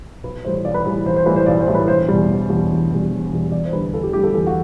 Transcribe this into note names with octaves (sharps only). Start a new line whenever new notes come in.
B1 B4
A2 E3 G3 C5
B1 D5
B4
A2 E3 G3 B4
B1 C5
C5
A2 E3 G3 B4
C5
B1 D5
C5
A2 E3 G3
B4
E1 C5
E2 B2 G3
E1
E2 B2 G3
E1
E2 B2 G3
E1
E2 B2 G3
E2 D5
C5
D3 G3 B4
E2 A4
G4
D3 G3 G4
A4
E2 A4
F#4